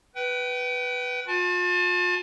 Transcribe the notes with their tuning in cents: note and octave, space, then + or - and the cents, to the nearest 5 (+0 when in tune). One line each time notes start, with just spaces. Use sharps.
B4 +0 G5 -35
F4 +40 A5 -35